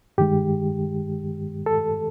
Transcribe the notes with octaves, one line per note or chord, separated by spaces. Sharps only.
G2 D#3 G#3 G4
A4